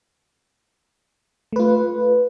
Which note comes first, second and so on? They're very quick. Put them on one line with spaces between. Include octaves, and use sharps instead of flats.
A3 B4 F4